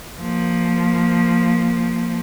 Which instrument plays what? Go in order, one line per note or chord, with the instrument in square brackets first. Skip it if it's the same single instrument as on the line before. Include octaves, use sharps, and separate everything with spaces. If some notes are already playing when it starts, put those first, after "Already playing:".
[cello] F3 A#3